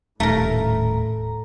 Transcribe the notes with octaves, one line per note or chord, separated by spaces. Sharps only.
D#1 A2 A3 A#4 A#5